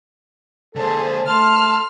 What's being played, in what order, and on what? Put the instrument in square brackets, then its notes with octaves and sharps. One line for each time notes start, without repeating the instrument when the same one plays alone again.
[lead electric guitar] D3 A#3 [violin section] G#4 C5 A5 [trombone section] A4
[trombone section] A3 [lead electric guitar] A5 [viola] C6 [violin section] F6